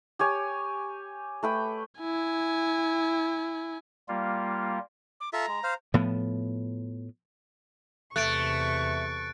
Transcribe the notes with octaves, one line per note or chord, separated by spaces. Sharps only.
G4 C#5 G#5
A3 B4 G5
E4 G#5
G3 A#3 F4
D6
F4 A4 E5 A#5
G#3
C5 F5
A2 F3 B3
E2 C3 A3 C#6 F#6 A6 D7